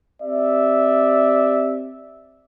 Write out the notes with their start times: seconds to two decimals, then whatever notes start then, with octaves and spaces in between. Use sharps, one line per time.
0.23 C4 G4 D5 E5